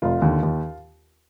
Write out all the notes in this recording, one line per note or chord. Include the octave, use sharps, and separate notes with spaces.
F1 F4
D#2 D3
D#2